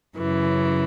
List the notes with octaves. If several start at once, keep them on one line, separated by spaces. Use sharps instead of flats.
F#2 C#3 E3